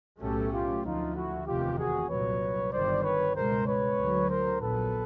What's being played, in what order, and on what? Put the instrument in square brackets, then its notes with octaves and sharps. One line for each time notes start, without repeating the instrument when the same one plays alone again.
[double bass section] B1 A2 F#3 A3 C#4 [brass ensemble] G4 A4
[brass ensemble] F4 G4
[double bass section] D2 D3 F3 A3 [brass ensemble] D#4 F4
[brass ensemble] E4 F#4
[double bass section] F1 E2 C3 D#3 [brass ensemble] F4 G4
[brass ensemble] F#4 G#4
[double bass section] C2 A#2 F#3 [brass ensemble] B4 C#5
[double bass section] G1 G2 D#3 [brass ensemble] C5 D5
[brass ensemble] B4 C#5
[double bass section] C#2 B2 G#3 [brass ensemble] A#4 C5
[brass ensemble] B4 C#5
[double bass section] D2 D3 F#3
[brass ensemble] A#4 C5
[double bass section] A#1 A#2 F#3 B3 [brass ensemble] A4 B4